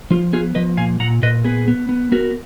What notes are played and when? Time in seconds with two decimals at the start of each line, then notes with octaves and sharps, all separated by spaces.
0.11 F3 F4
0.33 B3 F4 G#4
0.55 F3 B4 D#5
0.77 A#2 F5 G#5
1.00 A#2 F#5 A#5
1.22 A#2 B4 D#5
1.45 B3 G#4 B4
1.68 B3
1.89 B3
2.12 B3 F#4 A#4